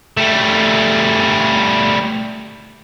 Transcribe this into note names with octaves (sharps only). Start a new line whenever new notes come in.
G3 A3